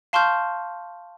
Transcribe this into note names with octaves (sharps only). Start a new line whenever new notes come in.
F5 A5 C6 C#6 F6 G6